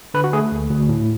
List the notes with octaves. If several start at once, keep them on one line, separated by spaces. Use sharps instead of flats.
D3 B4
F#4
A3 G#4
D2
D2
A2